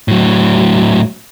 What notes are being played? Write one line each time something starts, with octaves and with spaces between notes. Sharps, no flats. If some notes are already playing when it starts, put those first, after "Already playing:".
A2 F#3